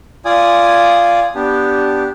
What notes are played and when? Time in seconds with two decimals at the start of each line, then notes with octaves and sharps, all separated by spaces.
0.25 F4 D5 G#5 D#6
1.35 B3 D4 G4